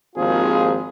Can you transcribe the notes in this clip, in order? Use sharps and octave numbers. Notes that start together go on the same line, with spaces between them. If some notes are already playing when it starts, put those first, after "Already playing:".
G#1 D#2 F3 C4 F4 G#4